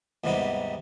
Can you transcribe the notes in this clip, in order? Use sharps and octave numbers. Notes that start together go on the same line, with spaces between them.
D#2 G#2 C3 G3 B3 D#4